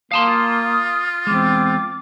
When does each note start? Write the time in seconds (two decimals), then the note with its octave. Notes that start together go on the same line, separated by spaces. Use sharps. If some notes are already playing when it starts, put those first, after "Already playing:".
0.11 A#3 F5 A5 C6 D#6
0.29 F4
1.27 E2 G#3 C4 D6